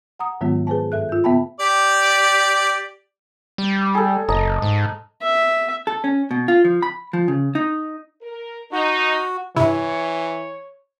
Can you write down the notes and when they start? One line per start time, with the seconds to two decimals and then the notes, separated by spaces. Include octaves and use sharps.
0.19 F#5 A#5 D#6
0.41 G#2 D#3 F#3 G#3 B3 F4
0.67 G#4 B4 C5 G#5 A5
0.92 G2 A4 E5 F#6
1.09 F4 G6
1.24 C#3 B3 E5 G5 A5 B5
1.60 G4 D5
3.58 G3
3.95 G#4 A4
4.29 F#1 D#5 A5 A#5
4.62 G#2
5.22 E5
5.87 A4
6.04 C#4
6.31 B2
6.48 F4
6.65 F3
6.82 B5
7.13 F3
7.28 C#3
7.55 D#4
8.22 A#4
8.72 D#4 F#4
9.56 G2 C3 E3 E4 C#5